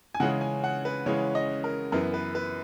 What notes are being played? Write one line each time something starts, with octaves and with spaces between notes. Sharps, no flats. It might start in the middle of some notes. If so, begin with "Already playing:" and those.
G#5
C#3 E3 G#3 C#4 F#5
G#5
F#5
B4
C#3 E3 G#3 C#4 C#5
D#5
A#4
F#2 E3 B3 A#4
B4
B4